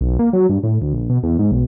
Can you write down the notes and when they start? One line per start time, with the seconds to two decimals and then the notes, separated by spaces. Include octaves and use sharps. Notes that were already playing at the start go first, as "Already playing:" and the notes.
0.01 B1
0.19 A#3
0.33 F#3
0.49 G2
0.63 A2
0.82 D2
0.93 A#1
1.10 B2
1.23 E2
1.39 G#2
1.52 B1